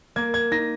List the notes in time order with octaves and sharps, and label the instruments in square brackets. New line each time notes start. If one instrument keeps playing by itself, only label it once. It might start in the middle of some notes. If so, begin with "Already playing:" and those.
[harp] A#3 [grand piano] G#6
[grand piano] G#6
[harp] D#4 [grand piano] A#6